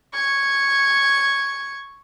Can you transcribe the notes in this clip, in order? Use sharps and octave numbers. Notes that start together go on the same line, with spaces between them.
C#6 G#6